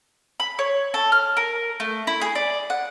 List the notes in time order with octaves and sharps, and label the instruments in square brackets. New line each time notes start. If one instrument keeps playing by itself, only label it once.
[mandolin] B5
C#5
A4
F6
A#4
A3
E4
G#4
D5
F#5